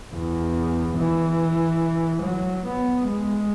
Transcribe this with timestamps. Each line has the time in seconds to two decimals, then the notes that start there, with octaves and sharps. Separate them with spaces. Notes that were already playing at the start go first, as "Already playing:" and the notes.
0.14 E2
0.97 E3
2.22 F#3
2.66 B3
3.07 G#3